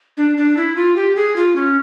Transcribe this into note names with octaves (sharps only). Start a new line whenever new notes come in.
D4
D4
E4
F4
G4
G#4
F4
C#4